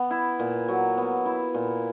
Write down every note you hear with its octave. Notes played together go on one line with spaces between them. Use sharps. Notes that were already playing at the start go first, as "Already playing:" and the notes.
Already playing: B3
E4
A#2
F#3
B3
E4
A#2